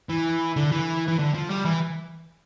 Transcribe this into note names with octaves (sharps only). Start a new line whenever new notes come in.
E3
D3
E3
E3
D3
F3
G3
E3